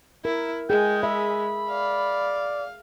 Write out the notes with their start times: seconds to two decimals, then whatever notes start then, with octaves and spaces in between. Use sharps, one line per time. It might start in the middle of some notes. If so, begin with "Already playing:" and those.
0.25 E4 A#4
0.70 G#3 G#4 G5
1.03 E5 B5
1.69 D5 F5